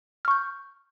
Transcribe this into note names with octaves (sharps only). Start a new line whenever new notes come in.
C#6 F6 G6